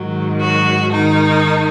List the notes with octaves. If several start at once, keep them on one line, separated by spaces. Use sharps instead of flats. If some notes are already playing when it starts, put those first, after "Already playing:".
Already playing: G#2 D#3 F#3
F#3 F#4
D#3 D#4